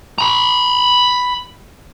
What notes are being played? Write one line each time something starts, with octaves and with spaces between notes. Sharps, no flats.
A#5 B5